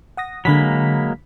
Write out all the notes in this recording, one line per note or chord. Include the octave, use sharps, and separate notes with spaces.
F#5 D#6 A#6
D3 F#3 G#3 A#3 B5 B6